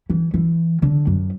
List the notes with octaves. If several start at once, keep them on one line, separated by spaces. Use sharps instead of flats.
E3
E3
D3
F#2